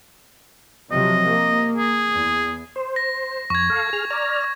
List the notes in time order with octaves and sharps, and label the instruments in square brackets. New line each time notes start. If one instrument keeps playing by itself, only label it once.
[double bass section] C3 F3 F#3 [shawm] D#5
[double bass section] A#3
[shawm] G#4
[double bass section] E2
[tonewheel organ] C5
[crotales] A#6
[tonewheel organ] F2 [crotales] C#6 G#6
[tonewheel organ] A4 F5
G#4 F6
D5 A#5 F6